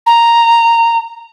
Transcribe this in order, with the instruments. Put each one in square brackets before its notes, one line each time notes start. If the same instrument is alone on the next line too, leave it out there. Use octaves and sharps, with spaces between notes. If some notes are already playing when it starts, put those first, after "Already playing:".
[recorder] A#5